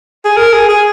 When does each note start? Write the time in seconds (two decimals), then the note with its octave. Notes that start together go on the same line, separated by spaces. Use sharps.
0.25 G#4
0.37 A#4
0.53 G#4
0.69 G#4